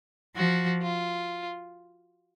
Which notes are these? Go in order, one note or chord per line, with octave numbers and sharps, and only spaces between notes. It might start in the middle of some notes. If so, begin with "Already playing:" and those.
F3 F#4
F4